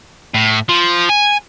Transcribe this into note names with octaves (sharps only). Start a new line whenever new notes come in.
A2
F3
G#5